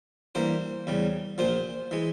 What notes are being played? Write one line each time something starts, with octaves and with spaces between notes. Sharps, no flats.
G2 E3 A#3 C5
E2 C#3 G3
A#1 A#2 F3 C5
E3 G#3